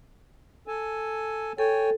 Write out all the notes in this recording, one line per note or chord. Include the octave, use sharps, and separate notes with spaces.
A4 G#5
A4 C#5 G5 G#5